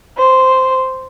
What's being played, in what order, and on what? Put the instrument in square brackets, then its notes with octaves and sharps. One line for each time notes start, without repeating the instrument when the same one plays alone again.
[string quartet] C5